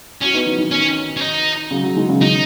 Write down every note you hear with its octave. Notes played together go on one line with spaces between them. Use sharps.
C#4 F#4
B3 D#4
D#3
D#3
C#4
C#4
D#4
C#3 F#3
C#3 F#3
D#3 G#3
C#3 F#3
D#3 D#4